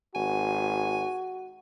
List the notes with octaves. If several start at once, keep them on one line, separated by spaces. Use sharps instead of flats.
G#1 F#4 G#5